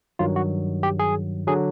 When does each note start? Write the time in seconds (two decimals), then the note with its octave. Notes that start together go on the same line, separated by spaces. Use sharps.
0.19 G2 D#3 F#3 F4
0.36 F#4
0.83 G4
0.99 G#4
1.47 D3 F#3 G#4